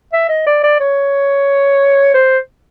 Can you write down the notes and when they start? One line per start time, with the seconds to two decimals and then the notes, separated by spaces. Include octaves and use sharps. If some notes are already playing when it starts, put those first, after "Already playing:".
0.13 E5
0.29 D#5
0.46 D5
0.64 D5
0.80 C#5
2.14 C5